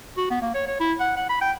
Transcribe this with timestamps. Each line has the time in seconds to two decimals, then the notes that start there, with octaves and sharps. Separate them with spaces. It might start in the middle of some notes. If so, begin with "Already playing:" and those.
0.17 F#4
0.30 B3
0.42 A#3
0.54 C#5
0.67 C#5
0.80 E4
1.00 F#5
1.16 F#5
1.29 B5
1.41 G5